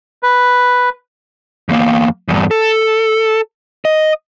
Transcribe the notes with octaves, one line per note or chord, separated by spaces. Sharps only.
B4
E2 A#3
E2 G2
A4
D#5